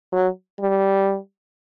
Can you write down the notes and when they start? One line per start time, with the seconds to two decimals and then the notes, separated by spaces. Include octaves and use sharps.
0.13 F#3
0.60 G3